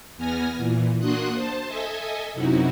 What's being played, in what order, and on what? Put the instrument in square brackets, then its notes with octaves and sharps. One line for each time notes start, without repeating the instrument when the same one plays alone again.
[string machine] E2 B3 G#5 F6 A#6
A#2 E3
A#3 D4 F#4 C6 D#6 F#6
C5 A5
A4 D#5 E5 G#5
F#2 C3 D#4 E4 F#4